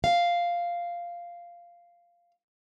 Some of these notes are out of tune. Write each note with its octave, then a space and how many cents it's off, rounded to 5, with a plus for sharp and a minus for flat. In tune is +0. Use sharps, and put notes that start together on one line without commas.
F5 -5